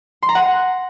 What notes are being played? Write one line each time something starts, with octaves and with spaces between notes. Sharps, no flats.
C6
A#5
F#5